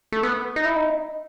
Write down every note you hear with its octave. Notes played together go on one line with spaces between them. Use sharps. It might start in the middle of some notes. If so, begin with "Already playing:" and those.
A3
B3
D#4
E4
D#4